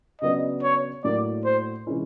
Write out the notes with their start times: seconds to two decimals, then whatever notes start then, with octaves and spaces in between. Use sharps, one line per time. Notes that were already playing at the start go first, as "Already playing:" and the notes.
0.22 C#3 F#3 B3 D4 D#5
0.63 C#5
1.04 A2 F#3 A#3 D4 D5
1.45 C5
1.87 C3 E3 G#3 C#4 E4